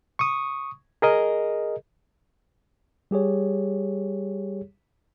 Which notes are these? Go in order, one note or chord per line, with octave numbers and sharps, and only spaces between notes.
C#6 D#6
G#4 A#4 D#5
G3 G4 G#4 C#5